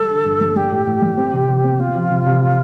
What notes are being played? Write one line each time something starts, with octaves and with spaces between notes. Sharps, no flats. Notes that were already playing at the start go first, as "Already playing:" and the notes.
Already playing: G3 A4
D3
G2
G3
G3 G4
A2
A2
G3
C4
C3
C3
C4
C4 F4
F3
C3
C3